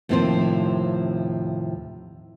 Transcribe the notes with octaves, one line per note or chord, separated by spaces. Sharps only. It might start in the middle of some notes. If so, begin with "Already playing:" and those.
D#2 A2 C3 F3 C4 C5